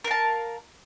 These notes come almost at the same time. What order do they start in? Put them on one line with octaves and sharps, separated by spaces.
A#4 F5 A5